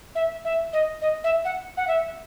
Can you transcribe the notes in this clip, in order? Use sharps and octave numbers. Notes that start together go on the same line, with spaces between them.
E5
E5
D#5
D#5
E5
F#5
F#5
E5